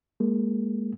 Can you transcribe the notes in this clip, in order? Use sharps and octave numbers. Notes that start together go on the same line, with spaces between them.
G#3 A#3